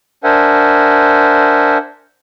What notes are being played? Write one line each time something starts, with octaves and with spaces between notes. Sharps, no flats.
D4 A#4 C5 E5 F#5 G#5